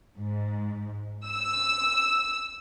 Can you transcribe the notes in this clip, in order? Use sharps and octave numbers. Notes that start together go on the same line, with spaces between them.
G#2
E6